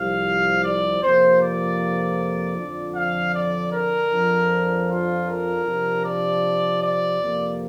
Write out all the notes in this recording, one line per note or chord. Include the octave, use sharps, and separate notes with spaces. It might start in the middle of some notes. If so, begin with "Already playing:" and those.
Already playing: C2 C3 F3 F5
D5
F2 C3 F3 A#3 C5
D5
F2 D3 F3 D4
F5
D5
A#4
F2 F3 D4
F4
A#4
C3 F3 D4
D5
D5
F2 C3 A#3